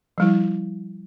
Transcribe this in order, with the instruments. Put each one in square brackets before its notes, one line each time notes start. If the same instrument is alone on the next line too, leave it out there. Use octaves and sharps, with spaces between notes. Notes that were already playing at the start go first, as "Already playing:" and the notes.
[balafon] F3 G3 E4